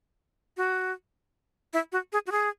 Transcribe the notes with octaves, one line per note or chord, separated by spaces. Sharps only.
F#4
E4
F#4
G#4
F#4
G#4